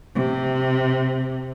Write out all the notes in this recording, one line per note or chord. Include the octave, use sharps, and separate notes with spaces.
C3